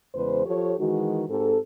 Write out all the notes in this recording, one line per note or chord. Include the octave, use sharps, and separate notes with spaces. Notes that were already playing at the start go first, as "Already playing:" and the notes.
E2 C#3 G#3 B4 C5
F3 G4 A4 C#5
D#3 E3 G#3 F#4
G#2 C4 G4 A4